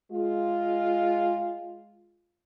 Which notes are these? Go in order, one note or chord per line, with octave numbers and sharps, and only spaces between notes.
G#3 F4